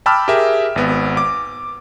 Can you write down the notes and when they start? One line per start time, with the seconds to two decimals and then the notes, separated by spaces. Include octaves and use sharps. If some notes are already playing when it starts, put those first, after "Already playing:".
0.06 G5 A5 B5 D6 E6 F6
0.28 G4 G#4 A#4 E5
0.76 G#1 B3
1.17 D6